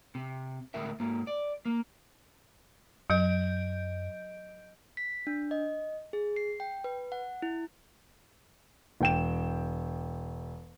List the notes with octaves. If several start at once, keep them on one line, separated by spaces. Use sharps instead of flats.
C3
D2 A2 G#3 A#4 E5
G#2 A#3
D5
A#3
F#2 F#3 D#5 G6 D7
B6
D4
D#5
G#4
C7
G5
B4
F#5
E4
E1 G5 E7